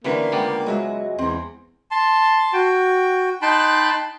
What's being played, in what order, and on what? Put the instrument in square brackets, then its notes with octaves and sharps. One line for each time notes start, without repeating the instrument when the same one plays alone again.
[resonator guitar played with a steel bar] D3 C#4 B4 [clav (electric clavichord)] E3 G3 B3 [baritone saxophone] A#3
[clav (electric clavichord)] C#2 B3 D5 [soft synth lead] G5
[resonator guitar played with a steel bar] F#3 F#4 E5 [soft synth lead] G#3
[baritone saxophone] E2 [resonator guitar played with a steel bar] C4
[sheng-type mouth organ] A5 C6
F#4 G5
D#4 G5 A5 B5 C6 F#6